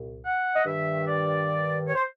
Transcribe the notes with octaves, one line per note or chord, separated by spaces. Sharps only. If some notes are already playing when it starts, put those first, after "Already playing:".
Already playing: C2 A#2
F#5
D#5
G2 D#3 E5
D5
C#5
C5